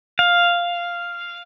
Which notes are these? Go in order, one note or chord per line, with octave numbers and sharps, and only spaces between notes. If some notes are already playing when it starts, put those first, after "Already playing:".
F5